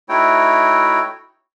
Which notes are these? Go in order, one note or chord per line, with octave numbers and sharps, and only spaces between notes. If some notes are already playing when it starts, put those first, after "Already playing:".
A3 D#4 E4 F#4 C#5 G5